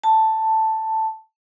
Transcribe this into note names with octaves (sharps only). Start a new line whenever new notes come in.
A5